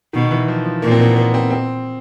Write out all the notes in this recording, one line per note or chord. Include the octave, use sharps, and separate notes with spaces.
B2 D#3
E3
F3
F3
A#2 A#3
C4
B3
B3
C4
C4